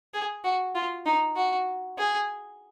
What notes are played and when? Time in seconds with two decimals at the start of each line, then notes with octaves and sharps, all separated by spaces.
0.14 G#4
0.44 F#4
0.75 F4
1.06 D#4
1.36 F#4
1.98 G#4